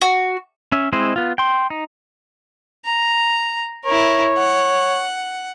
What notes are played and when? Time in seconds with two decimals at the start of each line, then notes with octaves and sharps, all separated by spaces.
0.02 F#4
0.72 C#4 E5
0.93 G#3 C4 E4 C5 D#5
1.16 B3 F4
1.38 G5 C6
1.70 D#4
2.85 A#5
3.86 E4 A#4 C#5
4.38 F#5